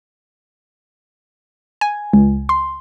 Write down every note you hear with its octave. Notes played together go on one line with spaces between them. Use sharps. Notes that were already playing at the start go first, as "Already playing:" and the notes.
G#5
C#2
C6